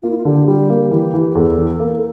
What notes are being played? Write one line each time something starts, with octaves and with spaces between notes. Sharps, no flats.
A#3 F4
E4
F4
D3 G4
G3 G4
A#3
E3 G4
E3
G4
E2 A4
E3
A#3